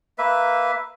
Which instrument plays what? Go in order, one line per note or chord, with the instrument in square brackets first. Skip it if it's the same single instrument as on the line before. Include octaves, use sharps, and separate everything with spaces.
[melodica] A#3 B4 E5